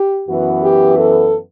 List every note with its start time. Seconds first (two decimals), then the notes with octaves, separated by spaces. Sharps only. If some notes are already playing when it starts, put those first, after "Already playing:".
Already playing: G4
0.27 F#2 E3 B3 F#4
0.64 G4
0.99 A4